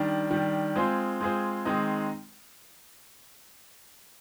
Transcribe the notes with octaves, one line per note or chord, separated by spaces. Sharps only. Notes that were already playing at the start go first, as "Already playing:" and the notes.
Already playing: D#3 G3 D4
D#3 G3 D4
G#3 C4 F4 G#4 C5
G#3 C4 F4 G#4 C5
D#3 G#3 C4 D#4